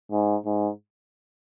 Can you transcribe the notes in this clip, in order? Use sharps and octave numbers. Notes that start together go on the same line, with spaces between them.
G#2
G#2